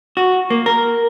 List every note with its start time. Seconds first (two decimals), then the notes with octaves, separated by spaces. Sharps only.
0.17 F#4
0.50 A#3
0.66 A#4